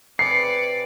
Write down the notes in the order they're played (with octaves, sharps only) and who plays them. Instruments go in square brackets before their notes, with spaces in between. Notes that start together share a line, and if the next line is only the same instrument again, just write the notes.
[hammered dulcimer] C3 G#4 B4 [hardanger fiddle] D5 [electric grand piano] C7 [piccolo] C#7